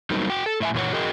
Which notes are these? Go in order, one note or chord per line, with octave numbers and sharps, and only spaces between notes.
F#3 G3 A#3 C4 D#4
F#4 G5
A4
A2 E5 G#5
F#2 A#2 E3 C4 C#5 F#5
F#4 G#4 A#4 D#5 G5